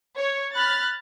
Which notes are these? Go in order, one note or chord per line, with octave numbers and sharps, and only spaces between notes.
C#5
B5 F6 F#6 A6